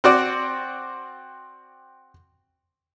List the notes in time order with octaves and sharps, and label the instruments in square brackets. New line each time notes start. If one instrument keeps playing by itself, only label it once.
[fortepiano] C4 F#4 D5